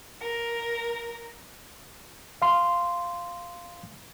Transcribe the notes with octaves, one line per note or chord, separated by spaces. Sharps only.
A#4
F5 C6